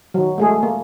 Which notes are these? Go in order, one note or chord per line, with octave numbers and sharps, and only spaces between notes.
D#3 F#3
G#3 A3 G#4
A#3